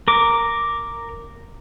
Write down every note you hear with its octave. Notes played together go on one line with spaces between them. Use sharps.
A#4 D6